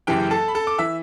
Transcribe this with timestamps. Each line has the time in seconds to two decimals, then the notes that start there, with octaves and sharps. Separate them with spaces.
0.07 F#1 F#2 E3 G4 G5
0.31 A4 A5
0.48 B5
0.55 A4 A5
0.67 D6
0.78 E3 E5 E6